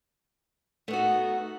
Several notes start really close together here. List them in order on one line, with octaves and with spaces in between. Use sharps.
A3 B3 F#4 D#4